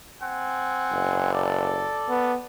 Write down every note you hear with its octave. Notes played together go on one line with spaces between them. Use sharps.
C4 F#5 G#5
F#1
A4 D5
B3